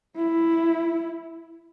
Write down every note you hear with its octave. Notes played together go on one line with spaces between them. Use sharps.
E4